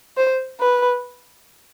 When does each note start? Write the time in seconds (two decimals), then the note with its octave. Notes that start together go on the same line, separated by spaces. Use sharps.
0.17 C5
0.60 B4